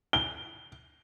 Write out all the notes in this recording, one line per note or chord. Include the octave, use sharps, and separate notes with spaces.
G7